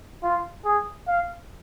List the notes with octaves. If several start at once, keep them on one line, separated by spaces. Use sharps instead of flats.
F4
G#4
F5